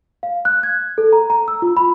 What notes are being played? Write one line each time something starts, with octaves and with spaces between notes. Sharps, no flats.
F5
F#6
G#6
A4
A#5
A#5
E6
F4
B5